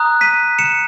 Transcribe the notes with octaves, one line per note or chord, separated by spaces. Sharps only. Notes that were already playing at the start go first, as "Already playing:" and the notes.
Already playing: A#5 D#6 F#6
B6 D#7
C#7 E7